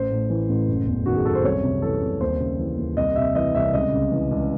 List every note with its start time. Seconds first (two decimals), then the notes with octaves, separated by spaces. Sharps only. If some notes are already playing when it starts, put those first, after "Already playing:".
Already playing: A1 C5
0.10 A2
0.30 E3
0.49 A1
0.68 F#1
0.87 E2
1.06 D#3 F#4
1.16 G#4
1.25 F#1 A4
1.35 C5
1.44 C2 C#5
1.64 C3
1.82 E3 A4
2.02 C2
2.21 D#2 C5
2.40 C#3
2.59 E3
2.78 D#2
2.97 C2 D#5
3.16 C3 E5
3.35 E3 D#5
3.55 C2 E5
3.74 C#2 D#5
3.92 C#3
4.12 E3
4.31 C#2